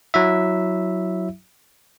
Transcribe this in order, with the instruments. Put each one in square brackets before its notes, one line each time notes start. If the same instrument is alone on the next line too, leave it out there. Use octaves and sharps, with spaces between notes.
[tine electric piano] F#3 E4 E5